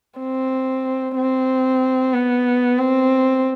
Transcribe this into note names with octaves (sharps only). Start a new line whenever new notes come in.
C4
C4
B3
C4